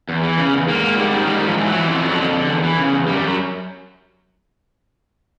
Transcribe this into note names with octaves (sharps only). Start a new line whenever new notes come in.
E2
E3
C#3
E2
G#2 A#3
G#2
D#3 G3
D#3
G#2 G3
G#2
F3
E3
F#3
E3
F2 F3
F2
F#3
D3
D3
E2
E3
C#3
E2
F#2 G3
F#2
F#3